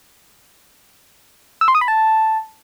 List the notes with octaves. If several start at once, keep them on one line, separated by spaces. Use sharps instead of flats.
E6
C6
D#6
B5
A5